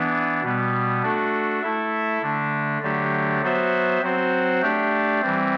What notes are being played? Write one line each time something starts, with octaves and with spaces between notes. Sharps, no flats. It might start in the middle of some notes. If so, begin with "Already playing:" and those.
Already playing: E3 B3 D4
B2 G3 B3
A3 D4 F#4 A4
A3 E4 A4 E5
D3 A3 D4
D3 F#3 A3 D4 G4
F#3 B3 F#4 C5 E5
F#3 C4 F#4 C5
A3 D4 G4 D5
E3 G3 C4